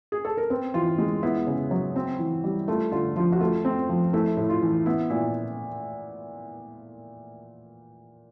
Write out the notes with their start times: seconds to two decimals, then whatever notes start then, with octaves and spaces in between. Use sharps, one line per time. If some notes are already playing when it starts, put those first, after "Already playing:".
0.12 G#4
0.25 A4
0.37 A#4
0.50 C4 B4
0.74 E3 F4
0.98 G#3
1.23 B3 E4
1.47 C#3
1.71 F#3
1.96 C4
2.19 E3
2.44 G3
2.68 A3 F4
2.92 D3 F4
3.16 F3 F4
3.32 F#4
3.40 A3 F4
3.65 C4
3.89 F3
4.13 A3 E4
4.37 A2
4.49 F4
4.62 E3
4.86 B3 E4
5.10 A#2 E4